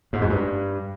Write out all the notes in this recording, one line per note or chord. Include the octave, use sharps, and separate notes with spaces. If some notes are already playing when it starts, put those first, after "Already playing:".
G#2
F#2
G2